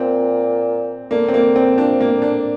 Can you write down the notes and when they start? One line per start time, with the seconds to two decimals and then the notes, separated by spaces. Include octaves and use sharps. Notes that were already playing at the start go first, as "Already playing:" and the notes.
Already playing: A#2 C4
1.11 D3 A#3
1.28 C4
1.34 A#3
1.56 C4
1.78 F3 D4
2.01 A#3
2.11 D3
2.22 D4